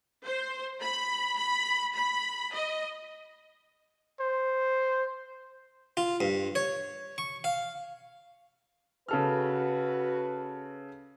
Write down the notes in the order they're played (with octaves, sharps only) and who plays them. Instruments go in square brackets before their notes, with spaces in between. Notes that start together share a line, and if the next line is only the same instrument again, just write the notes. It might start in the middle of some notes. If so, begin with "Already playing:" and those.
[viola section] C5
B5
B5
B5
D#5
[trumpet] C5
[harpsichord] F4
G2
C#5
C#6
F5
[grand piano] C#3 A4 F6 [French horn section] F#4 B4